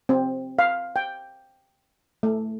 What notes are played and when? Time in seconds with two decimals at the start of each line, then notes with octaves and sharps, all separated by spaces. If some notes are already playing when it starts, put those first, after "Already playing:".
0.09 C4
0.59 F5
0.96 G5
2.23 A3